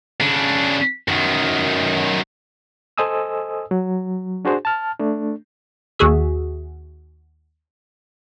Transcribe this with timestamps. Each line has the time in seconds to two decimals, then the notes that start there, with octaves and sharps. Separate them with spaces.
0.21 C#3 D4
1.08 F#2 D#3
2.98 A4 C5 D#5 G#5 D#6 E6
3.71 F#3
4.45 D4 F#4 G#4 C5
4.65 A5 F6
5.00 A3 D4
5.99 D#2 F#4 G#4 E5